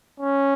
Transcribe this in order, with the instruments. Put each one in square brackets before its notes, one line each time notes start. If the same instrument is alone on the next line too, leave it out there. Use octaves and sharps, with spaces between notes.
[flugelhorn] C#4